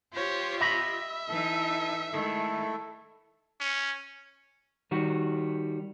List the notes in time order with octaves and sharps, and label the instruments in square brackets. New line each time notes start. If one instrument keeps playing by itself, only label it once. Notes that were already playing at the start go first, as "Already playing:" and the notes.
[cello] F4 G4 [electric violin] C5 C#5
[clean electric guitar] D#5 B5 [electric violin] E5
[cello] E3 D#4 [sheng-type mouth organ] E4 A4
[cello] D#3 G#3 [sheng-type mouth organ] A3 E4 A4
[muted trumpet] C#4
[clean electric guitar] D#3 G3 F#4